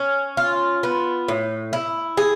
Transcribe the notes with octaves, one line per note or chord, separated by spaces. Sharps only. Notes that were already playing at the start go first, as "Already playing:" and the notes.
Already playing: C#4
F4
B3
A2
E4
G#4